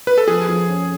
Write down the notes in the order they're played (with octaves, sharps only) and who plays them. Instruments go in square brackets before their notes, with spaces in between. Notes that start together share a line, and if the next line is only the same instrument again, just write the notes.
[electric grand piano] B4
A4
[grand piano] F3 [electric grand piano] G#4
[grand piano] F3
C#4